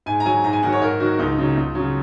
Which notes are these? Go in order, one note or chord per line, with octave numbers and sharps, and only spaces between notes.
G#2 G#5
A#5
F#3 G#5
G#2 A#5
G#5
D#3 F#3 F#5
C#5
G#2 A#4
D#3 F#3 F#4
C#2 D#4
C#3 F#3
C#2
C#3 F#3